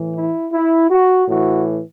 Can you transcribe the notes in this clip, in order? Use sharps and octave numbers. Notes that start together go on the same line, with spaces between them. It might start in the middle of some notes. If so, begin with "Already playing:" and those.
Already playing: A2 E3
E4
E4
F#4
A2 E3 F#4